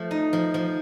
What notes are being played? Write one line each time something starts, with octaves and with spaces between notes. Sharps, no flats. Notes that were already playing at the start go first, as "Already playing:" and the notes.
Already playing: F3 A3
D#4
F3
F3